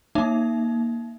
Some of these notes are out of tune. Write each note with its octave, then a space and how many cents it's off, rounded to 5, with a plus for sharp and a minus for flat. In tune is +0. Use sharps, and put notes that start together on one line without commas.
A#3 +0 D#4 +0 E5 +30